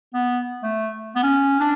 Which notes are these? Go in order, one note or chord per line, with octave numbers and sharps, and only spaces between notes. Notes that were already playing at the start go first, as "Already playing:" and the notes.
B3
A3
B3
C#4
D4